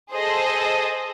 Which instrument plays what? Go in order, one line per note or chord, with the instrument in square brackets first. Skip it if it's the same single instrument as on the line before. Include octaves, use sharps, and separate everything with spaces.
[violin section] G#4 A4 C5 D#5